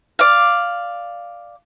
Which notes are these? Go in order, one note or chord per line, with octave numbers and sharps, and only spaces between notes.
D5 F5